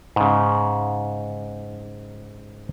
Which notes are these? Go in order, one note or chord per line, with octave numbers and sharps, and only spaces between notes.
G#2 C#3